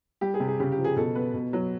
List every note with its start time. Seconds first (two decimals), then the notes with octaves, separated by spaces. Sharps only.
0.21 G3 G4
0.34 G#4
0.40 C3
0.47 G#4
0.60 C#3 G4
0.72 G4
0.78 F3
0.84 G#4
0.96 B2 A4
1.15 B3 B4
1.34 B2
1.53 F#3